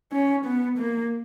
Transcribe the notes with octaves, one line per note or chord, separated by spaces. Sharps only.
C#4
B3
A#3